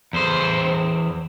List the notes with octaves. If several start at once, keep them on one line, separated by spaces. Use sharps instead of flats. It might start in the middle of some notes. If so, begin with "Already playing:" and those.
E2 C5